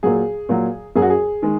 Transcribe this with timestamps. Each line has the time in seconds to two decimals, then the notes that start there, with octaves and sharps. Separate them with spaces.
0.03 A#2 F#3 G#4
0.49 A#2 F#3
0.96 F#2 F#3 G#4
1.02 F#4
1.10 G#4
1.42 D#3 G#3